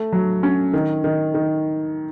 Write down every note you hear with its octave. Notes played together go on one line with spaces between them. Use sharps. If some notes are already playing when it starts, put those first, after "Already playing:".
Already playing: A3
F#3
C#4
D#3
D#3
D#3